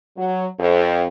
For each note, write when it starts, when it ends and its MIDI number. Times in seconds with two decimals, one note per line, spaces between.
0.17 0.47 54
0.60 1.05 41